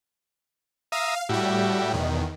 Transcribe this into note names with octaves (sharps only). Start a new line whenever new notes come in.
E5 F5 A#5 D#6
A2 G3 F#4 G4 E5
E2 B2 D#3